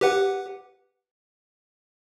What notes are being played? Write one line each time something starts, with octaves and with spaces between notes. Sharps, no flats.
G4 B4 F#5